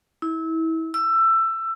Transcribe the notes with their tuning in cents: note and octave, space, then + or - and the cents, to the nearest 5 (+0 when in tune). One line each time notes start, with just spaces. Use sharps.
E4 -30
E6 +20